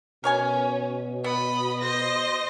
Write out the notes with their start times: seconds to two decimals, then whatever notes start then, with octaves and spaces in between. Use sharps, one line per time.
0.24 B2 C#4 A#4 C#5 G#5
1.24 B3 D#5 B5
1.81 C5 D#5 A#6